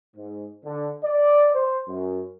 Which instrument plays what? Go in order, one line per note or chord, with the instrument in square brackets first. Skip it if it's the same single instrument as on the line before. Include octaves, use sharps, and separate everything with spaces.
[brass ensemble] G#2
D3
D5
C5
F#2